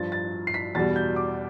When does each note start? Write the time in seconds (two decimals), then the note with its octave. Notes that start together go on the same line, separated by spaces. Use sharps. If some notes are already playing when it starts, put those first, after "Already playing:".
Already playing: G2 F3 A6
0.12 A6
0.47 C7
0.54 B6
0.75 E2 B2 G3 A6
0.96 G6
1.16 D6